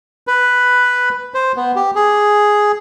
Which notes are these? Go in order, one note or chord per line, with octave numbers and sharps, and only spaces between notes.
B4
C5
B3
G4
G#4